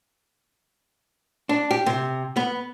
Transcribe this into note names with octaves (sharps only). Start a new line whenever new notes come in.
D4
G4
C3
B3